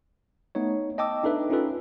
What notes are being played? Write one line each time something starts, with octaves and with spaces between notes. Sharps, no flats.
A3 B3 D#4 C#5
D#5 G5 A5 D6 E6
D4 D#4 A4 B4 E5
C#4 D#4 F4 A4 B4